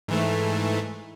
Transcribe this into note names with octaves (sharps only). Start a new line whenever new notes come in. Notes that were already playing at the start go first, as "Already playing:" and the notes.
G#2 E3 A3